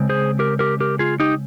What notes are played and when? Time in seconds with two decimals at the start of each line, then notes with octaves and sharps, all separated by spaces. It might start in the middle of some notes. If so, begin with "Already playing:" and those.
Already playing: C#3 G#3 C4
0.10 G#4 C5
0.39 G4 A#4
0.59 G4 A#4
0.80 G4 A#4
0.99 F4 G#4
1.20 D#4 G4